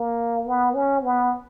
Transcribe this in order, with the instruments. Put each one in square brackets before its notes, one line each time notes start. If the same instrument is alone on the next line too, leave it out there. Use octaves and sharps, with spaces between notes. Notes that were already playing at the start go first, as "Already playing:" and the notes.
Already playing: [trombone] A#3
B3
C#4
B3